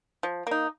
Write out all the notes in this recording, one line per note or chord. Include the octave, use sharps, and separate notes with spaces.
F3
A#3 D#4